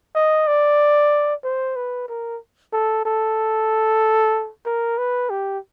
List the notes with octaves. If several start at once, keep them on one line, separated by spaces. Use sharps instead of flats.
D#5
D5
C5
B4
A#4
A4
A4
A#4
B4
G4